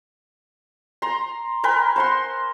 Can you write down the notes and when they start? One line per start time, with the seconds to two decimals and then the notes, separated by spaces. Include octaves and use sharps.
1.02 A#5 C6
1.64 A#4 B4 G5 G#5
1.96 C5 F#5 C6